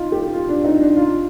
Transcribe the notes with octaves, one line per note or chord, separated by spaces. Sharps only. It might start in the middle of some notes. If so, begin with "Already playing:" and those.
Already playing: D#4 F4
G4
F4
D4
D#4
D4
F4